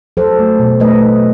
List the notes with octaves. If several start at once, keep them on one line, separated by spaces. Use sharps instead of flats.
F#3 A4 C5
A3
B2
A3 B4 D#5
F#3